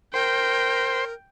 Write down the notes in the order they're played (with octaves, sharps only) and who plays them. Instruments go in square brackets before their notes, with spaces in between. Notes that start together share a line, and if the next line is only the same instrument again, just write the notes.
[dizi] A#4 [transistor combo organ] C5 [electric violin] G5